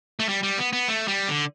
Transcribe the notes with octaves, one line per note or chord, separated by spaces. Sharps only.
A3
G3
G3
B3
B3
A3
G3
D3